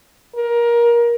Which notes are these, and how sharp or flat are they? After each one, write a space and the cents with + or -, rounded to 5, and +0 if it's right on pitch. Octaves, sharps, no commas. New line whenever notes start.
A#4 +20